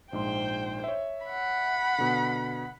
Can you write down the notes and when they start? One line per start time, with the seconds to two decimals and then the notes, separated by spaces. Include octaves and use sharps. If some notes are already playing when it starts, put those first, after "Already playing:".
0.13 A#1 G#2 C5 G5 C6
0.84 C#5 E5
1.26 F#5 B5
1.98 B2 D3